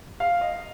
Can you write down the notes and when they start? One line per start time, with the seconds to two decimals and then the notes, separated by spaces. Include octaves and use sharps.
0.20 F5
0.41 D#5